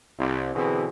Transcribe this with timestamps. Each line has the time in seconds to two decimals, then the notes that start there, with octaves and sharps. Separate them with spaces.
0.19 C2
0.55 B2 D3 E3 C4 F#4 G#4